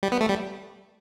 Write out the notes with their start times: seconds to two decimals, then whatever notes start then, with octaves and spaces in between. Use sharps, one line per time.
0.03 G3
0.12 B3
0.21 A3
0.29 G3